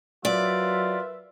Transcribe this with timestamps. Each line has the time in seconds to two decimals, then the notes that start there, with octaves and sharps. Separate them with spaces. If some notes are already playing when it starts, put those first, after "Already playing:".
0.25 F#3 F4 A#4 B4 D5 E5